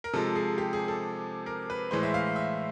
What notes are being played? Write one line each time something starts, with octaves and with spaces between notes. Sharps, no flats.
A#4
C3 F3 G#3 A4
G#4
G4
G#4
A4
A#4
B4
A2 E3 G#3 C5
E5
F5
E5